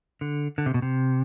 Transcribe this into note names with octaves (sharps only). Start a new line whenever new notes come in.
D3
D3
C3
B2
C3